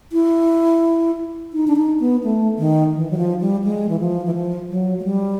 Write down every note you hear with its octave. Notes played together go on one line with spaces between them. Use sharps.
E4
D#4
D4
D#4
B3
A3
D#3
E3
F#3
F3
G3
G#3
E3
F3
E3
F3
F#3
G#3
G3